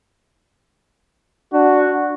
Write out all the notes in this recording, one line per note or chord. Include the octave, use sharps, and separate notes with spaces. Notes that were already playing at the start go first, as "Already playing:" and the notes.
D4 F#4